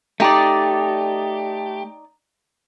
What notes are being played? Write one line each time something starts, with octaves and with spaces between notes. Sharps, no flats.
A3 D#4 G4 D5